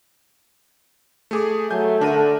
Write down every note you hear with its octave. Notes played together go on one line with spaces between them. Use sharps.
A3 G#4 D6
F#3 A3 G#5 G6
D3 D4 A#4 D#7